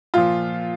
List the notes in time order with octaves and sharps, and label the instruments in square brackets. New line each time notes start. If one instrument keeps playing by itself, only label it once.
[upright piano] A#2 F3 F4